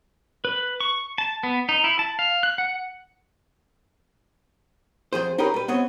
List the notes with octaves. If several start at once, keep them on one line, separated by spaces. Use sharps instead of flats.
B4
C#6
A5
B3
D#4
E4
A5
F5
F#6
F#5
F2 F3 G#4 C5
D#4 G4 G#4 A#4 B4 C#5
G3 B4
B3 C4 C#5 D#5